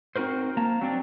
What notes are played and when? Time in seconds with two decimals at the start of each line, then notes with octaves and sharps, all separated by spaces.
0.16 C4 D#4 F#4 A#4 C5
0.57 A#3 A5 A#5
0.81 F#3 C4 D4